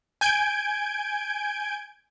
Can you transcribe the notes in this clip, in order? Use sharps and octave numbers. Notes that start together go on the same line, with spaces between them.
G#5 G6 G#6 D7